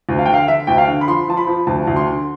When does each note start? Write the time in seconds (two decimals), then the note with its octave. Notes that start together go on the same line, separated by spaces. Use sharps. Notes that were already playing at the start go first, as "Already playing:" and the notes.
0.09 D2
0.19 F5
0.26 D3 G5
0.34 F5
0.48 D3 E5
0.67 D2 G5
0.78 F5
0.88 D3
1.01 B5
1.08 F3 C6
1.28 F3 A5
1.37 B5
1.47 F3
1.67 D2 A5
1.87 D2
1.96 C6
2.07 D3